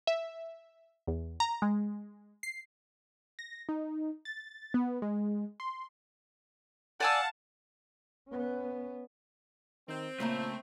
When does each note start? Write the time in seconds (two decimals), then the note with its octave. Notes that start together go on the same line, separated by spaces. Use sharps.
0.07 E5
1.08 E2
1.40 A#5
1.62 G#3
2.43 C7
3.39 A#6
3.69 D#4
4.25 A6
4.74 B3
5.02 G#3
5.60 C6
7.00 D5 F5 F#5 G#5 A5 E6
8.29 B3 C#4
9.88 D#3 C4
10.20 A#2 C#3 A3 A#3 E5 A5